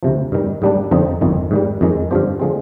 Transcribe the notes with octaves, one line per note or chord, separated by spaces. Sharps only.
D2 C3 F3
G2 D#3 G3
G#2 G3 A#3 D4
F2 D3 F3 C4 D#4
G1 F2 D#3
G#2 D#3 G3
F2 D#3 G#3
G2 D3 F3 C4 G4
D3 F3 G#3 C4